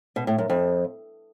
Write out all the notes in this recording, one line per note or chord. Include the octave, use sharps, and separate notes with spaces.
B2
A2
F#2
F2